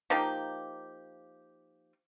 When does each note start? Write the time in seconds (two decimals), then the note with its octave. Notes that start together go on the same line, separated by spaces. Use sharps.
0.10 F3 A#3 D#4 G4